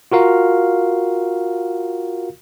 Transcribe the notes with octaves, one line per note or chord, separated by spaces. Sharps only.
F4 F#4 A#4 F5